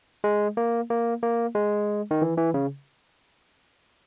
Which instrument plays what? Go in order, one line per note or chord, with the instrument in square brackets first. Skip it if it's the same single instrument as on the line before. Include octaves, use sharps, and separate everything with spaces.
[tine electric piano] G#3
A#3
A#3
A#3
G#3
D#3
E3
E3
C#3